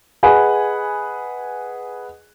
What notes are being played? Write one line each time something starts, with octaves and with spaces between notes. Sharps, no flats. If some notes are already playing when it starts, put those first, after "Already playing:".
G#4 B4 D#5 F#5 G#5